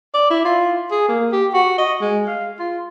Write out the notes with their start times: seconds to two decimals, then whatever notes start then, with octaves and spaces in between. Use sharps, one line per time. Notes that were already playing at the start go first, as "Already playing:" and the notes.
0.14 D5
0.30 E4
0.45 F4
0.91 G#4
1.08 A#3
1.32 G4
1.54 F#4
1.78 D#5
2.01 G#3
2.27 F5
2.59 F4